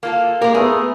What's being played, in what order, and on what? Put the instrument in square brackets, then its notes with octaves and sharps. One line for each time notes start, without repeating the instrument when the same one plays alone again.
[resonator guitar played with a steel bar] A#3 F4 A4
[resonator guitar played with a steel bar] G#3 G4 [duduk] A#3 [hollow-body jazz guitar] A#4
[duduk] A3 [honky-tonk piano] B3 B4 [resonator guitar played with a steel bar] G#4